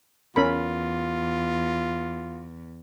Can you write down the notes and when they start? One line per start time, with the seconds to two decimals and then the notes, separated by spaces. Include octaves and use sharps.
0.36 E2 C#4 F4 A#4 B5